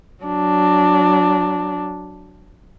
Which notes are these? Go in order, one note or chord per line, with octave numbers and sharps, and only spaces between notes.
F#3 D4